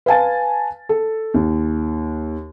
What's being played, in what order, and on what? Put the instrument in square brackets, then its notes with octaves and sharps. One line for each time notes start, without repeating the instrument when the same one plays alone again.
[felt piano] B4 F5 G#5 A5 A6
A4
D#2